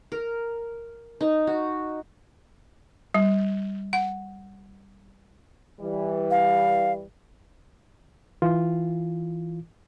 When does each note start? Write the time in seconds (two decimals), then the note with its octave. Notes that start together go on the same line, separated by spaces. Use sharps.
0.12 A#4
1.21 D#4
1.47 F#4
3.14 G3
3.93 F#5
5.80 E3 G3
6.31 F5
8.42 E3 F4